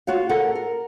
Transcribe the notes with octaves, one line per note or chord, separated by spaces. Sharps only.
F4 F#4 C#5 F5
A4 A#4 F#5
A#4